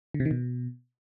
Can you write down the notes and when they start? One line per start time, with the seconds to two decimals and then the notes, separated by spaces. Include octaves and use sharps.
0.14 D3
0.20 C3
0.25 D#3
0.31 B2